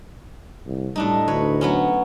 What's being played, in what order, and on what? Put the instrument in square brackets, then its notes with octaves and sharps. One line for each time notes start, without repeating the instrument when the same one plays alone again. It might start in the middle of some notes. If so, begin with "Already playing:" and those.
[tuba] C2
[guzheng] A2 D4 D#4 [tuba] G3
[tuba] D2 [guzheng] B4 C#5
[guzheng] F#3 B3 C#4